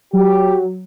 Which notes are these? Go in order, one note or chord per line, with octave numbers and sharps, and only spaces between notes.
F#3 G4